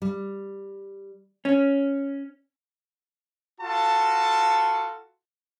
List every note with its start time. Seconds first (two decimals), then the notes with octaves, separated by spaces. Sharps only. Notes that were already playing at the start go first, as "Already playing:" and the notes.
0.02 G3
1.45 C#4
3.60 F4 F#4 A4 A5